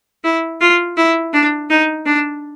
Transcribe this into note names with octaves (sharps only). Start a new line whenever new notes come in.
E4
F4
E4
D4
D#4
D4